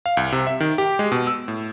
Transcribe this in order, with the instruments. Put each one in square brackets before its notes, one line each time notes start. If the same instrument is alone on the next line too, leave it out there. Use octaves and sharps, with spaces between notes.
[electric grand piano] F5
C2
C3
E5
D#3
G4
G#3
B2
E6
A2